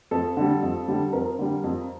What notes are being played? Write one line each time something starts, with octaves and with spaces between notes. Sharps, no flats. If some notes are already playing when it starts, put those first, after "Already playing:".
F2 A4
D3 G3
F2
D3 G3
F2 A#4
D3 G3
F2